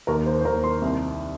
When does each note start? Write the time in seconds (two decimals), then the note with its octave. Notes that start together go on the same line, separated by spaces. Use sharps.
0.07 D#2 A#4
0.26 C5
0.41 C5
0.45 D#2 A#4
0.64 C6
0.82 C2